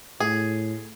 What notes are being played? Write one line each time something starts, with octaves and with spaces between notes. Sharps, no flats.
A2 G#4